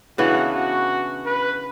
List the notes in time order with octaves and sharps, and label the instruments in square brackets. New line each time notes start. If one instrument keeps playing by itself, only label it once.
[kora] C#3 E3 B3 D4 [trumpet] F#4
[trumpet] F#4
B4